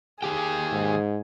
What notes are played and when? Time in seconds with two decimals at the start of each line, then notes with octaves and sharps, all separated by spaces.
0.23 D#3 G4 G#4 G5
0.73 G#2